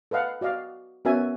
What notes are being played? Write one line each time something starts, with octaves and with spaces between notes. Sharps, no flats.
A4 B4 D#5 F5 F#5
F#4 D5 D#5 F5
B3 C#4 F#4 A#4 E5 G#5